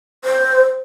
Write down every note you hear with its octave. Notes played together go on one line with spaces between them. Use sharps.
C5